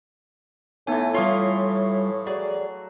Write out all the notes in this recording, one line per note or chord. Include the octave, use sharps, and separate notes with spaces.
A2 E3 A3 B3 D#4 G#5
E3 G3 F4 C#5 F5 C6 C#6 D#6
F#3 G#4 D5